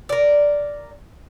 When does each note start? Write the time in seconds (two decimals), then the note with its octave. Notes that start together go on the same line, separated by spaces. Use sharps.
0.09 A#4 D5